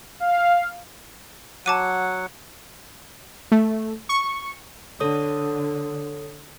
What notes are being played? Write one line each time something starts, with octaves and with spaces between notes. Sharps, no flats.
F5
F#3 F#5 A5 D6 D#7
A3
C#6
D3 A4 C#5 D#6